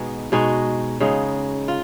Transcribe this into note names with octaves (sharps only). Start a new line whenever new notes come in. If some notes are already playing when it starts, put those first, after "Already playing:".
Already playing: B2 G#3 B3 D#4
B2 G#3 D#4 F#4
C#3 G#3 D#4
F4